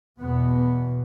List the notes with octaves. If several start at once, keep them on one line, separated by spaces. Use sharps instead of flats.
E2 B2 B3